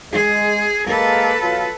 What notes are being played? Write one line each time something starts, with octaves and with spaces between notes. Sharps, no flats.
G#3 G#4
G#3 A#3 A4 B4
B2 F#3 F4